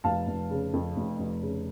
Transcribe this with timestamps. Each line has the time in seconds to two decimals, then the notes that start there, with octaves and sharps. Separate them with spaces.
0.04 F1 F5 A5
0.27 F1
0.50 C#3
0.73 F2
0.96 F1
1.19 F1
1.42 C#3